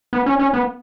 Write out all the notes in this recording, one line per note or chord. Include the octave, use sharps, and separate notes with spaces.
B3
C#4
C#4
B3